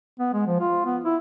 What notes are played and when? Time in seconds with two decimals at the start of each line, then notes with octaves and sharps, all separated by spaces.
0.20 B3
0.33 G#3
0.46 F3
0.60 F4
0.85 B3
1.04 E4